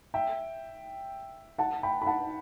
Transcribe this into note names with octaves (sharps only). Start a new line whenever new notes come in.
E5 G5
F#5 A5
G5 B5
B5
F#5 A5